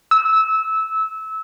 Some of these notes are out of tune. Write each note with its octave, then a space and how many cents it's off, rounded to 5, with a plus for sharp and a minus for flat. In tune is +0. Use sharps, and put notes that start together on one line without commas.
E6 -20